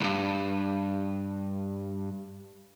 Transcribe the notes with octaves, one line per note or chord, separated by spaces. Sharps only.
C2 G2